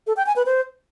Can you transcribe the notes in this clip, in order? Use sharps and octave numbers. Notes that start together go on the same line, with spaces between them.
A4
G5
G#5
B4
C5